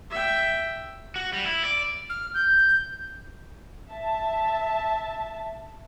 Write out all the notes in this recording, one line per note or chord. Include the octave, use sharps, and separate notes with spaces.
E5 G5
F#4
G3
E4
D5
F6
G6
E5 A5